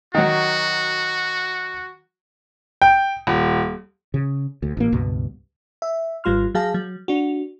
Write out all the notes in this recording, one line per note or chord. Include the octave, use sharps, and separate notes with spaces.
D#3 F#3 F#4
G5
D#1
C#3
D2
A1 A#3
C#2 G2 B2
E5
G#1 G3 F4 C6 F6
F#3 G#4 F5 A5 A#6
F#3
D4 F#4